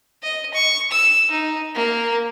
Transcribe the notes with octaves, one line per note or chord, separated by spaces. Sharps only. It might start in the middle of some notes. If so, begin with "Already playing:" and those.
D#5
C#6
E6
D#4
A#3